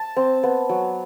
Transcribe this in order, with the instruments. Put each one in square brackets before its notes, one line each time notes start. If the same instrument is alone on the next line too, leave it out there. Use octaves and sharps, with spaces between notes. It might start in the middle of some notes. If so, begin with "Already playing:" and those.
Already playing: [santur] A5
C4
B3
F#3